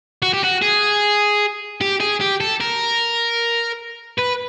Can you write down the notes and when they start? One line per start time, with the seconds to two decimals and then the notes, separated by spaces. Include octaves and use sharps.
0.22 F#4
0.33 G4
0.44 F#4
0.62 G#4
1.81 G4
2.01 G#4
2.21 G4
2.41 A4
2.60 A#4
4.19 B4